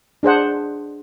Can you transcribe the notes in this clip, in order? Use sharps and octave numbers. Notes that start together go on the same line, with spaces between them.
D4 G#4 C5 F#5